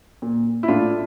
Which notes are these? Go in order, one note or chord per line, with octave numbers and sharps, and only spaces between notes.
A#2
E4
A2 D4 F4